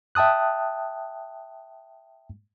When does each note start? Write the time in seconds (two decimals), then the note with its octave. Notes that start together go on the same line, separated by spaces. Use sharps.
0.15 E5 G5 A5 D#6 F#6